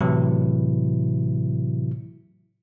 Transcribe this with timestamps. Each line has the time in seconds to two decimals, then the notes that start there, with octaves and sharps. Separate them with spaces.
0.01 A2 C3 E3 F#3 E4